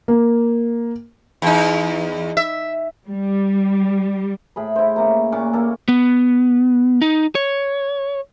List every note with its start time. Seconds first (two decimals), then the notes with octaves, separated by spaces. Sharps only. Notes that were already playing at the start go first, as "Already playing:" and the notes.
0.08 A#3
1.42 E2 D#4
2.37 E5
3.07 G3
4.56 A2 G#4 B5
4.76 E4 C5
4.96 C#3 A#3 A#5
5.32 A#2 C#4 F#5 D6
5.53 A#3 A4
5.88 B3
7.02 D#4
7.35 C#5